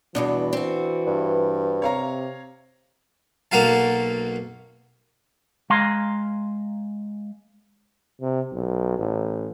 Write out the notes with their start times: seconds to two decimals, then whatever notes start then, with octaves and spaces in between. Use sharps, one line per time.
0.15 E2 G2 B2 E3 D4
0.53 C4 F#4
1.07 G2
1.82 C3 C#5 F5 A#5
3.52 B1 A#3 F#4 F5 A5
5.70 G#3 F5 G#5 A#5 C6
8.21 C3
8.53 B1
8.99 A1